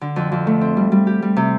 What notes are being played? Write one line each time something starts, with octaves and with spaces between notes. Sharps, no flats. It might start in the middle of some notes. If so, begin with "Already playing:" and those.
D3
F2
F2
A3
C4
G3
G3
G4
G3
C3